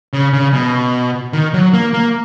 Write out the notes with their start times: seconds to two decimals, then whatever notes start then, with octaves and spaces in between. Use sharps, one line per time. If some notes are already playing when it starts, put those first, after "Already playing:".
0.13 C#3
0.33 C#3
0.53 B2
1.33 D#3
1.54 F#3
1.73 A#3
1.94 A#3